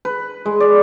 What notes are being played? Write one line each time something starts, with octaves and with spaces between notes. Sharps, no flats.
B4
G#3
D5